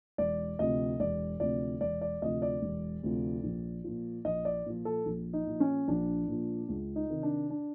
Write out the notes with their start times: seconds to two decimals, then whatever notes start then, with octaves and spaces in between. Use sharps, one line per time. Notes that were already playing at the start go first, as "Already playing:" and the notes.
0.18 E1 D5
0.59 D2 C3 F3 D#5
1.00 E1 D5
1.40 D2 C3 F3 D5
1.81 E1 D5
2.01 D5
2.22 D2 C3 F3 D#5
2.42 D5
2.62 E1
3.03 D2 C3 F3
3.44 A#1
3.84 A#2 F3
4.25 A#1 D#5
4.45 D5
4.66 A#2 F3
4.85 A4
5.06 A#1
5.33 D#4
5.46 A#2 F3
5.60 C#4
5.88 A#1 D4
6.28 A#2 F3
6.69 C#2
6.96 D#4
7.10 C3 D#3
7.23 D4
7.50 D4